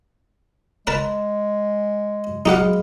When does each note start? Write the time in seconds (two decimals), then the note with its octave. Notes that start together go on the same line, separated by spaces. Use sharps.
0.87 G#3 A#4 B4 A5
2.46 F#3 G#3 B3 D#4 G4 F5 F#5